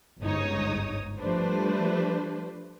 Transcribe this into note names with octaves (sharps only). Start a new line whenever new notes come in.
G1 C#2 G#2 D#4 C#5 D#6
F3 G3 A3 D4 B4 C5